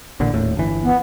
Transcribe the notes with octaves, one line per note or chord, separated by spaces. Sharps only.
A1 A#2 D3
D#1 A2
G1 E3
B3